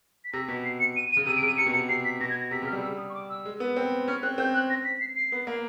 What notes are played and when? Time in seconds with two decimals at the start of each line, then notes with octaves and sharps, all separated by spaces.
0.25 B6
0.33 C3 A#6
0.48 B2 B6
0.65 C7
0.80 C#7
0.96 D#7
1.11 D#7
1.17 C#3
1.26 C3 D#7
1.37 D7
1.42 C#3
1.47 D#7
1.58 C3 C#7
1.66 B2
1.73 C3 C#7
1.89 C3 C7
2.05 B6
2.21 B2 A#6
2.30 G#6
2.41 A#6
2.51 C3 B6
2.62 C#3
2.67 F6
2.73 G3
2.82 E6
2.98 D#6
3.09 C#6
3.14 D6
3.30 E6
3.45 G#3
3.60 B3
3.76 C4
4.08 C#4 F6
4.22 C4 F#6
4.38 C4 G6
4.54 F#6
4.70 A#6
4.85 B6
5.00 C7
5.16 C7
5.32 B3
5.47 A#3